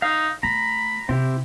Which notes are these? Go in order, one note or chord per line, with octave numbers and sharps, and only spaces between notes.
D#4 F5
A3 A#5 B5
C3 C4 E4 G4